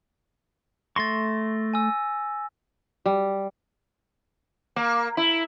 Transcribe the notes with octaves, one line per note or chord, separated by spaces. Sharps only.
A3 C6 C#6 A6 A#6
G#5 E6
G3
A#3
E4